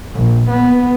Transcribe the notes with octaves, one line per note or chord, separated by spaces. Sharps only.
A#1
B3